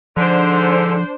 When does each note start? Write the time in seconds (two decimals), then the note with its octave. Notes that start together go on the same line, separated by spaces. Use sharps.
0.17 G#2 D3 F3 D4 C5